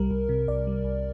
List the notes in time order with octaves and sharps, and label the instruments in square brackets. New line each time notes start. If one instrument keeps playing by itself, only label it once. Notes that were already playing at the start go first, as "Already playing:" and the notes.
Already playing: [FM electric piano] C2 G3 A#4
C2
C3
C2 D5
G3
C2